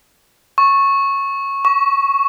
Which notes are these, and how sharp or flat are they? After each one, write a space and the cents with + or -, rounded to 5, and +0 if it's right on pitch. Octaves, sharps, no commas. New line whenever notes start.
C#6 -10
C#6 +20